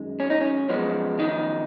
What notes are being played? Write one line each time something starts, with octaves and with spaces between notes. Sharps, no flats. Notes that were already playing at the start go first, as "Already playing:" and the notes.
Already playing: F#2 D#3 G#3
C#4
D#4
C#4
F#2 F3 G#3 B3
D#3 D#4